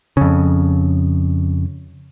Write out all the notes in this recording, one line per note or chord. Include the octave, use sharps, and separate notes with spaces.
F2 C#3